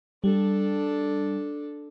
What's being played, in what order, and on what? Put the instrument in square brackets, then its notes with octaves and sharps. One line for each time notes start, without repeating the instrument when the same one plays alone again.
[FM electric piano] G3 [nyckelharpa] D4 A4